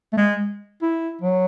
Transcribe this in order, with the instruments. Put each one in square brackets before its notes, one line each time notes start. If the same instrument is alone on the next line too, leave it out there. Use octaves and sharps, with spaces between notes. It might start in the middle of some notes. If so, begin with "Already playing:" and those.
[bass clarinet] A3
G#3
E4
F#3